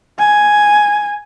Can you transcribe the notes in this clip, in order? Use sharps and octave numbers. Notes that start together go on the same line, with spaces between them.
G#5